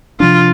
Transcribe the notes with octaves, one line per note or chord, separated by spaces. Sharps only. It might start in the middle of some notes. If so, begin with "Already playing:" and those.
C3 F3 D4 F4